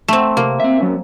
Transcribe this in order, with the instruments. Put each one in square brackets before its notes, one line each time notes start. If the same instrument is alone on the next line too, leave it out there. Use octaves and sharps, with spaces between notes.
[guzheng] A3 C4
[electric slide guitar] C3 [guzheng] A#3
[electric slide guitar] C4 E5
F#3 C#4